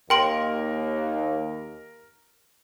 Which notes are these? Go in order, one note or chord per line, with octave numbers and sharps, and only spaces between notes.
D#2 A#4 G5 C6 D7